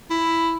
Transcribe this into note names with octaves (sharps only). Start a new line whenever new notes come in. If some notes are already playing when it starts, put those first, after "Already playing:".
E4